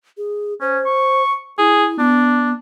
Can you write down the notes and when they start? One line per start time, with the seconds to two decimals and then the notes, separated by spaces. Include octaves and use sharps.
0.17 G#4
0.61 C#4 C5
0.86 C#6
1.59 E4 G#4
1.99 B3 D4